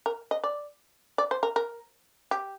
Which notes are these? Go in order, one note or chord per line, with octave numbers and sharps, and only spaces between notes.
A#4
D#5
D5
D5
C5
A#4
A#4
G4